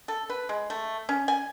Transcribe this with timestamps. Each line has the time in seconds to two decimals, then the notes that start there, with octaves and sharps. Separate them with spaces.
0.08 A4
0.29 B4
0.49 G#3
0.70 A3
1.09 C#4
1.28 G#5